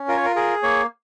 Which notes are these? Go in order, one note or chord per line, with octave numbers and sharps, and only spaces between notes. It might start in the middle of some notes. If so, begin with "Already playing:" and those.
Already playing: C#4
F4 A#4
C#5
A#4
G#4 A#4
A#3 C#5